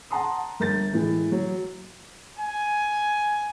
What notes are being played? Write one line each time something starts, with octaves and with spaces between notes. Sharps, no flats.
F#5 A5 A#5 C6 D#6
G1 A#4 G6 A6
A2 E3 G#3
F#3
G#5